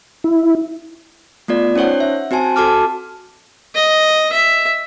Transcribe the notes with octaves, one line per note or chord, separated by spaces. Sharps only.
E4
A3 B3 F4 D5
C#4 D#4 C5 C#5 F#5
E5
C4 F#4 C5 G#5 A5
F#4 A4 A5 D6 F6
D#5
E5